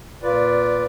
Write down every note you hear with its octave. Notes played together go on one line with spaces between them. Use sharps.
A#2 F4 B4 D5